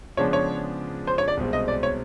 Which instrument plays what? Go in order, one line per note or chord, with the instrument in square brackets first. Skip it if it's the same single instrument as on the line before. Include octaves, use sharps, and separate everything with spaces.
[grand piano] C#3 F3 G#3 B3 D4 [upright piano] C#5
[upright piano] C#5
C5
C#5
D5
[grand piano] C2 B2 G#3 C4
[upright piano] D#5
D5
C#5